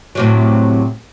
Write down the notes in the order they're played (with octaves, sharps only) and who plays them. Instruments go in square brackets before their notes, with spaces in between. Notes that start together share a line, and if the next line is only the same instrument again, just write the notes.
[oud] A2 C3 F#3